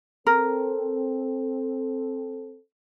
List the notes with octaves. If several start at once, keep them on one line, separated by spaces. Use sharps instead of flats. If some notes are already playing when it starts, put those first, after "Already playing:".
C4 A4 A#4